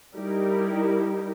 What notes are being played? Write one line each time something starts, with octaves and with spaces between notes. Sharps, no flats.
G3 D#4 E4 G4 A#4